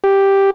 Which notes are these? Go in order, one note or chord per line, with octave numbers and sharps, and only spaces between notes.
G4